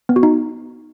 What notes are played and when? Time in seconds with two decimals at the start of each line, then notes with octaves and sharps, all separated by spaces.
0.09 B3
0.16 F#4
0.23 D#4